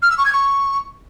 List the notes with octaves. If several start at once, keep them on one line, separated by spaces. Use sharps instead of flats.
F6
E6
C#6
G#6
C#6